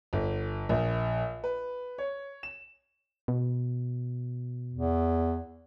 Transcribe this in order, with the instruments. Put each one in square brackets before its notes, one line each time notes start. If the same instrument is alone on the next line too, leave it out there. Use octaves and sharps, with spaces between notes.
[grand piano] G1
A#1
B4
C#5
E7
[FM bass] B2
[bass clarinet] E2